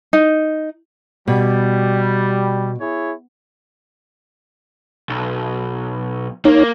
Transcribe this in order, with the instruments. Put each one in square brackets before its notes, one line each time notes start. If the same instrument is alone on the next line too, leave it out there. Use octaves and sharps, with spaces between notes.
[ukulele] D#4
[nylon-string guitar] B2 [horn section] G3
[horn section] E4 G#4 C#5
[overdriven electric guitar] B1
[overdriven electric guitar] A#3 [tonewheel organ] D#4 C#5